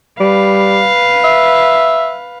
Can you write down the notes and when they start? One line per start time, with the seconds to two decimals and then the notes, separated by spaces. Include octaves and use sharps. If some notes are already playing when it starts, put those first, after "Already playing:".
0.20 G3 B4 F5
1.24 E5